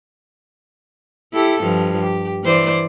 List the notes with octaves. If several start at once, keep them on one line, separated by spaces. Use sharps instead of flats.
E4 G4 A4
G2 F3
G4
E3 C5 D5